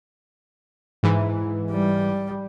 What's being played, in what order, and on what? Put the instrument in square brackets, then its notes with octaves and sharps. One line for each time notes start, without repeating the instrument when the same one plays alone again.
[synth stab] G#2 E3
[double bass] G3